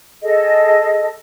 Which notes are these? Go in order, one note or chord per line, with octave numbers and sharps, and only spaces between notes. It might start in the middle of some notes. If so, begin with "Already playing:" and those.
G#4 A4 D#5